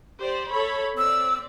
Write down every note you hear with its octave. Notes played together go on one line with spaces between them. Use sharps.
G4 C5 D5
A4 C#5 B5
C4 D5 E6